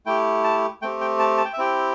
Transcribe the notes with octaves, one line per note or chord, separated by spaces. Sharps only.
A3 E4 G4 G5
A5
A3 C4 G4 G5
G5
A5
A5
G5
E5
C4 E4 G4 G5